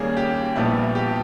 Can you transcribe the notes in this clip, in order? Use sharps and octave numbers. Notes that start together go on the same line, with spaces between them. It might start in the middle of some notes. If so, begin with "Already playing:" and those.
Already playing: D#2 C#3 G3 A#3 C#4 G#4
G4
A#1 A#2 G3 B3 E4
G4